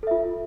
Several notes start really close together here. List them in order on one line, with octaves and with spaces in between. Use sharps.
A4 E5 F4